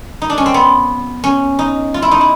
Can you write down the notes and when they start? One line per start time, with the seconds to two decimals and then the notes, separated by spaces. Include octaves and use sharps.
0.22 D#4
0.30 D4
0.38 C#4
0.46 C4
0.54 B3
1.24 C#4
1.59 D#4
1.94 F4
2.02 E4
2.11 D#4
2.21 E4